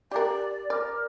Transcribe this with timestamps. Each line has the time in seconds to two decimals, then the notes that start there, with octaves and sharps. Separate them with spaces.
0.11 G4 A#4 D5
0.70 A#4 D5